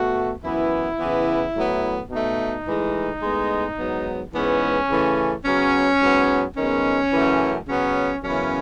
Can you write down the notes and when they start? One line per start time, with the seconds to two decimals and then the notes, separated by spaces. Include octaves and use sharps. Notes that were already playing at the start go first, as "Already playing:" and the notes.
Already playing: B2 A3 F#4
0.43 F#2 E3 B3 E4
0.99 C#3 E3 B3
1.55 A2 F#3 B3
2.11 B2 A3 D#4
2.66 A2 E3 G#3
3.22 A2 G#3 B3
3.77 G#2 F#3 B3
4.34 G#2 E3 G#3 B3 C#4
4.90 C#3 E3 A3
5.44 C#3 F#3 B3 C#4
6.00 G#2 F#3 B3
6.56 F#2 D#3 G#3 B3 C#4
7.12 F#2 C#3 E3 A3
7.67 C#3 F#3 B3 C#4
8.23 F#2 C#3 E3 B3 C#4